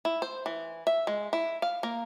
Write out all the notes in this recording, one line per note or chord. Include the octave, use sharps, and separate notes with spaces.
E4
C5
E3
E5
G#3
E4
F5
A#3